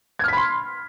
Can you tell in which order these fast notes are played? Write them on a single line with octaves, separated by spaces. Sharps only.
G#6 F6 B6 B5 C6